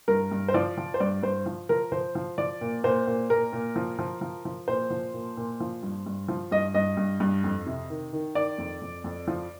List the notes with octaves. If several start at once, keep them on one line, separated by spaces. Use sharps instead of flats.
G2 A#4
G2
C5
F3 D5
F3
C5
G2 D5
G2 C5
F3
F3 A#4
F3 C5
F3
F3 D5
A#2
A#2 C5
A#2
A#2 A#4
A#2
F3
F3
F3
F3
A#2 C5
F3
A#2
A#2
F3
G2
G2
F3
G2 D#5
G2 D#5
G2
G2
F2
C3
D#3
D#3
D#3 D5
F2
F2
F2
F3